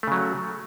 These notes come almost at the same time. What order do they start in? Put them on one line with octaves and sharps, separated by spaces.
A3 C#3 F#3